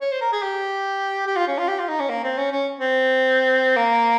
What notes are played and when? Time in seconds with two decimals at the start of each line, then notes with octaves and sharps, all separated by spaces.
0.01 C#5
0.12 C5
0.21 A#4
0.32 G#4
0.42 G4
1.27 G4
1.36 F4
1.48 C#4
1.58 F4
1.68 G4
1.79 F4
1.89 D#4
2.00 C#4
2.09 A#3
2.24 C4
2.38 C#4
2.52 C#4
2.80 C4
3.76 A#3